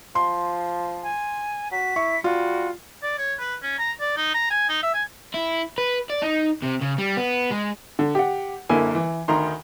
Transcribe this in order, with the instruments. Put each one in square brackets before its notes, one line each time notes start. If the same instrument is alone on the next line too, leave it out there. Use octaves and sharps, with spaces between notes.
[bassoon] F3 [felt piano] C6
[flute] G#5
[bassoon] F#4 [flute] B6
[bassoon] E4 [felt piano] C#6
[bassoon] G3 [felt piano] F4 [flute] F#4
[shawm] D5
C#5
B4
C#4
A#5
D5
D#4
A#5
G#5
D#4
E5
G#5
[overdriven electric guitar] E4
B4
D5
D#4
C3
C#3
G3
B3
G#3
[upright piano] D3
G4 F#5
F#1 D3 A#3 E4 G#5
E3
D2 D#3 A#5 C6